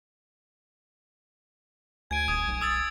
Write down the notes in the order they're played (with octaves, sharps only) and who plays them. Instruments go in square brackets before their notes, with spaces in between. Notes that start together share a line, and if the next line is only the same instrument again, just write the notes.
[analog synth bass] D2 [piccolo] G#5 [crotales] G#6 D7
[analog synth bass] D#1 [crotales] D#6
[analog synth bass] B1
[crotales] D#6 E6 A6